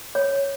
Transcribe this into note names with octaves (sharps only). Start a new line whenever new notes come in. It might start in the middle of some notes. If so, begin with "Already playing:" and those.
C#5